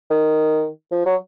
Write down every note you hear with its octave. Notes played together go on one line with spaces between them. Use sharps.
D#3
F3
F#3